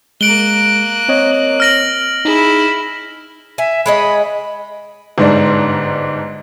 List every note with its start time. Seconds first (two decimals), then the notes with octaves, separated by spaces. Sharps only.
0.21 G#3 A#3 F#6 D7 G7
1.09 C4 C#5 D#5
1.60 F6 A#6 F#7
2.25 D#4 E4 G#4
3.58 E5 G#5
3.86 G#3 C#5 D#5 B5
5.18 G1 G#2 D4